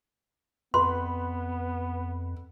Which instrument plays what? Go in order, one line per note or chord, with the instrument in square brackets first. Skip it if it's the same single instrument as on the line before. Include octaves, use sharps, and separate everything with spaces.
[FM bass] F2 [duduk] B3 [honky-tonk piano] B4 [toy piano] C6